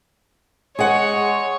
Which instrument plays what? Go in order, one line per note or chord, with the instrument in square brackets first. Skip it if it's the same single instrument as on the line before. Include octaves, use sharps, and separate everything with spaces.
[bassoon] G#3 [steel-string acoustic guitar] G#4 F#5 [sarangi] C#5